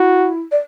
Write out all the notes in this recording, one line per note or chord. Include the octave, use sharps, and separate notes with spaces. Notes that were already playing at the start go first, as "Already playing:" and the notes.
Already playing: E4 F#4
D5